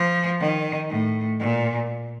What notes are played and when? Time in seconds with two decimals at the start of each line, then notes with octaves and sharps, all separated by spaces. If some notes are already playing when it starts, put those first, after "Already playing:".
Already playing: F3
0.40 D#3
0.90 A2
1.39 A#2